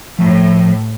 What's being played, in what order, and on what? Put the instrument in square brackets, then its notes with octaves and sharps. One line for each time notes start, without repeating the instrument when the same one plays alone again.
[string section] A2 [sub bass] F3